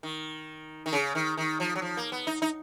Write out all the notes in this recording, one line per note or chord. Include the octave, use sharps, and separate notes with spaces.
D#3
D#3
C#3
D#3
D#3
F3
F#3
F3
A#3
B3
D#4
D#4